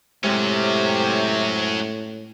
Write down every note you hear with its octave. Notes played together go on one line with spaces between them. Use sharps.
A2 C3 F#3 G#3 C#4 C#5 C6